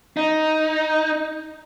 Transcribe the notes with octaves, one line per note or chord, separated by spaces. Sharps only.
D#4